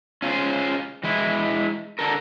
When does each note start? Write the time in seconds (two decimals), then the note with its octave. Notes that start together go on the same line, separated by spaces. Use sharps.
0.22 C#4 F4 G#4 C5
1.04 E3 G#3 E4
1.99 D3 A4 A#4